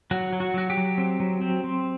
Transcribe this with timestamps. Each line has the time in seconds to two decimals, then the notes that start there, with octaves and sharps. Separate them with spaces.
0.11 F#3 F#4
0.33 F#3
0.40 F#4
0.54 F#3 F#4
0.70 G4
0.77 F#3
0.98 C4
1.20 F#3
1.42 C4
1.64 C4